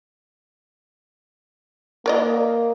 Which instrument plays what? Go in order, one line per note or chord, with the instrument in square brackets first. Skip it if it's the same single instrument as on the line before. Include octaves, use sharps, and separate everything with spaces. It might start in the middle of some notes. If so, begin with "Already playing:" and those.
[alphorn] A#3 [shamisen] A#4 D5 D#5